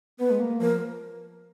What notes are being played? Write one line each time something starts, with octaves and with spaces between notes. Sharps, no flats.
B3 B4
G#3
A#3
F3 A#4